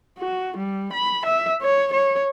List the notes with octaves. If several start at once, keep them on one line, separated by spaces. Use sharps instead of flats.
F#4
G3
B5
E5
C#5
C#5